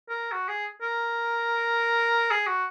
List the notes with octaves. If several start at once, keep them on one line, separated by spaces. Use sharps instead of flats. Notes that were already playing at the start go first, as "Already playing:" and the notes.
A#4
F#4
G#4
A#4
G#4
F#4